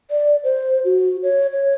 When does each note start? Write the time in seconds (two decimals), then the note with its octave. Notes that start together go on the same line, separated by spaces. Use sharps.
0.11 D5
0.44 C5
0.85 F#4
1.23 C#5
1.53 C#5